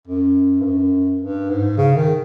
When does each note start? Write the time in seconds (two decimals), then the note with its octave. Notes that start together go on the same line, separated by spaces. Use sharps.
0.07 F#2
0.60 G2
0.65 F#2
1.21 G2
1.50 G#2
1.77 C#3
1.96 D#3